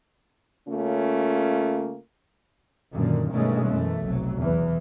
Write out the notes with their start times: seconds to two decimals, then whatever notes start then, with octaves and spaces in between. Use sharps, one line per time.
0.69 C#3 A3 A#3 C#4 F4
2.93 F#2 A#2 D3 D#3
3.33 G2 B2 D#3 G#3 A3 C#4
3.68 F#2 E3 A3
4.03 F1 B1 F#3
4.39 E2 E3